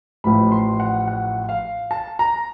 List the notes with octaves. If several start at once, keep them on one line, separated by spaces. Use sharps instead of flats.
A1 A2 F3 B5
C6
F#5
F#5
F5
A5
A#5